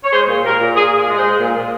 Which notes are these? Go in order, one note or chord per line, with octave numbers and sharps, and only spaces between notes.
C#5
G#3 G#4 C5
A#2
A#2 G4 A#4
A#2
A#2 F4 G#4
A#2
F4 G#4
G#3
G#4 C5
G#3
A#2
A#2